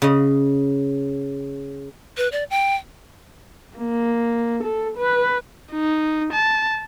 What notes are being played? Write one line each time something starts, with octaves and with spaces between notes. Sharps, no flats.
C#3 D#5
B4
D5
G5
A#3
A4
B4
D#4
A5